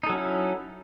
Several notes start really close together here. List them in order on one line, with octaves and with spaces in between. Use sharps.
D#4 A4 F#3 C#4 E4